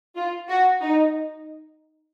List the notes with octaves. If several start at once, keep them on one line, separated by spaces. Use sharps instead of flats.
F4
F#4
D#4